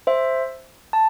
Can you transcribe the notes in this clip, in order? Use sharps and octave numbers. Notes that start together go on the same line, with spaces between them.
C5 E5
A5